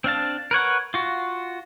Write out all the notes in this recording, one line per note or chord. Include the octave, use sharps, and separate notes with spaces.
C4 D4 F5 A5
A#4 B4 C#5 F#5
F4 F#4